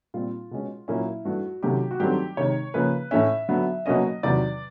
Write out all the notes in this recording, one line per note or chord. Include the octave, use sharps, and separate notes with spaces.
A#2 G3 C4 F4
B2 G#3 C#4
A#2 F#3 A#3 C#4 E4
G2 E3 A3 F#4
C3 D#3 F#3 A3 C#4 G4
F#4
G2 D#3 F#3 A3 C4 G4
C3 D#3 G#3 C#5
C#3 F3 A#3 C#4 B4
A2 E3 A3 C#4 E5
D3 F#3 B3
B2 F#3 A#3 C#4 D#5
E2 C3 D#3 F#3 D5